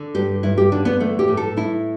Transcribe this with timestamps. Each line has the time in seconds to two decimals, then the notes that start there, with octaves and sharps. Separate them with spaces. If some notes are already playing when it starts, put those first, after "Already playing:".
Already playing: D3
0.15 G2 G4
0.43 G2 E4
0.58 G4
0.72 D3 D4
0.85 B3
1.00 E3 A3
1.19 G4
1.28 A2
1.37 A4
1.57 A2 E4